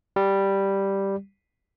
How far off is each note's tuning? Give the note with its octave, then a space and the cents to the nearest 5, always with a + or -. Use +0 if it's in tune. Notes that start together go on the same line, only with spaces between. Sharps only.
G3 +0